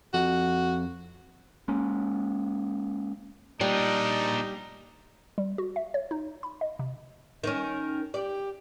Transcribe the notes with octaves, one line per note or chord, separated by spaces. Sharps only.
F2 F#4
G#3 A#3 C#4
A#2 G3 D4 D#4
G3
F#4
E5
C#5
D#4
B5
D#5
C3
D#3 C#4 A#4
G4 D5